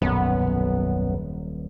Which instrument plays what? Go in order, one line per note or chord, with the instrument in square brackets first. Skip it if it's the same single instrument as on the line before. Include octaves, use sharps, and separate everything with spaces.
[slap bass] D#1 [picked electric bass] B1 F#2 [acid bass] B3